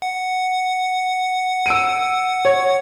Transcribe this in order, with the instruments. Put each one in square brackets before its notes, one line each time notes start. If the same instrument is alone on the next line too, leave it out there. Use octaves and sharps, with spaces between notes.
[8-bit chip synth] F#5
[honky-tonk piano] E6 D7 D#7
C#5